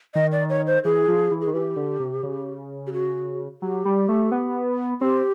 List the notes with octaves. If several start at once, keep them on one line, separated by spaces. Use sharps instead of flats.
D#3 D#5
D5
C#5
C5
E3 G#4
F3
E3
G#4
D#3
E3 G4
D3
C3
C#3
G4
F#4
F#3 G4
G3
A3
B3
C4 G4